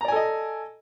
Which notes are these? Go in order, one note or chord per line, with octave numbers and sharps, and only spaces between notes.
A4 D5 D#5 G#5 A#5